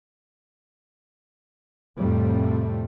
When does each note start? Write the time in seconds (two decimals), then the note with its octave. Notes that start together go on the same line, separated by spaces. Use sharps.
1.98 F2 A2 C3 G3 A3 C4